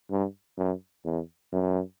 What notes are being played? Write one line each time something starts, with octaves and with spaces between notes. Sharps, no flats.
G2
F#2
E2
F#2